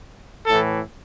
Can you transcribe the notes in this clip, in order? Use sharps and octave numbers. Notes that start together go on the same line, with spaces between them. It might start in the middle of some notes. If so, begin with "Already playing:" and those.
A2 E3 A4